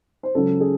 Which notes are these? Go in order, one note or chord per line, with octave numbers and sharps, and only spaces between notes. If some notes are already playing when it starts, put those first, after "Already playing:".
C5
C#2 C#3 F#3 A4
G#4